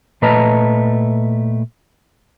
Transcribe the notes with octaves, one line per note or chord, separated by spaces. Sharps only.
A#2 A3 B4 D#5 A5 A#5